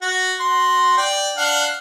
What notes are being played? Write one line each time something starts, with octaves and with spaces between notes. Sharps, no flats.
F#4
F#4 C6
D5 G5
D4 F5 F#5